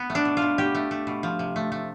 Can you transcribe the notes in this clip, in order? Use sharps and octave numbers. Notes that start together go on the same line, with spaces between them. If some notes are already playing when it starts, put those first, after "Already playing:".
Already playing: B3
A3
D4
B2
F4
B2
B2 G4
A3
A3
B2
F3
C3
A3
A3